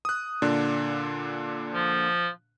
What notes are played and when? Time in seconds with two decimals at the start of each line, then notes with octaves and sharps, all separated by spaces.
0.05 D#6 F#6
0.42 A#2 D3 D4
1.74 F3